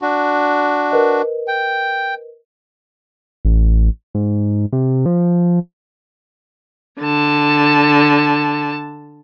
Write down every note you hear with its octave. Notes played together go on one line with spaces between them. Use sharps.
D4 F#4
A#4 B4 D#5
G5
A1
G#2
C3
F3
D3 A5